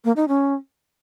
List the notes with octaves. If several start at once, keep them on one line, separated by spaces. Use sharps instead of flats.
A#3
D#4
C#4